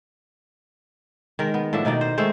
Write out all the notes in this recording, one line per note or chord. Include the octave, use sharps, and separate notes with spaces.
D#3 G#3 A#4
B3
A2 F3 D4 E5
B2 D#3 D#4 D5
C5
D#3 G#3 A3 C5